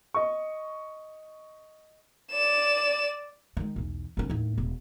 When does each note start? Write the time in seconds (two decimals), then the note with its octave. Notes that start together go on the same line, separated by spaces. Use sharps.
0.14 D#5 C#6
2.31 D5 E7
3.57 D#3 G#3
3.76 B1 E2
4.17 D#3 C#4
4.30 D#2 A2
4.58 E1